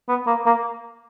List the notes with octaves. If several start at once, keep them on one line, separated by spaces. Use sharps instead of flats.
B3
A#3
A#3